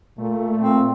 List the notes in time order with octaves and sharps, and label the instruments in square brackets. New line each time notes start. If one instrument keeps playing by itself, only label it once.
[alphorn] A#2 [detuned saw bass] A3
[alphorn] A#2 [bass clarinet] C4